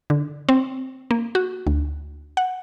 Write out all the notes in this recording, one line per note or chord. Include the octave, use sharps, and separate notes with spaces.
D3
C4
A#3
F#4
D2
F#5